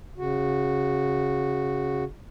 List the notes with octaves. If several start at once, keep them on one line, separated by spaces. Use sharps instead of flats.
C#3 F#4